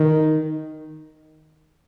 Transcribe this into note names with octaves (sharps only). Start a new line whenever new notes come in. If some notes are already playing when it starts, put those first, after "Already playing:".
Already playing: D#3